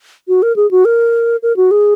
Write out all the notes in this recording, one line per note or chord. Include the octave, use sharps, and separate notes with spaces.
F#4
A#4
G#4
F#4
A#4
A#4
F#4
G#4